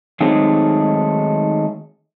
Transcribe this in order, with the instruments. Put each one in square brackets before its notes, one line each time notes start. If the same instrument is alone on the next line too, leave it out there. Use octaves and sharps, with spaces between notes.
[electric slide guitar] D#3 F#3 G#3 A3 C4 D#4